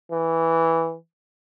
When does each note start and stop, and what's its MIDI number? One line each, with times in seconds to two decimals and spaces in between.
0.12 0.95 52